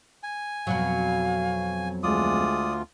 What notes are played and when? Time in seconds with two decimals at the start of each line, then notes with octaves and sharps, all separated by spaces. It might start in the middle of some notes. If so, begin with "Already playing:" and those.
0.23 G#5
0.67 F2 B2 F#3 F5
2.03 D2 G#3 F4 D5 D#6